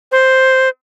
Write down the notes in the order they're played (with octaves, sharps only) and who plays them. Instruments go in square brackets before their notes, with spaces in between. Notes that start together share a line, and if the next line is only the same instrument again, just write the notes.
[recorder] C5